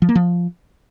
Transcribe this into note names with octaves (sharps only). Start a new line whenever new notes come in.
F3
A#3
F3